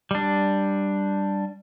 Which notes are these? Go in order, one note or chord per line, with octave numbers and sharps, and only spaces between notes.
G3 D4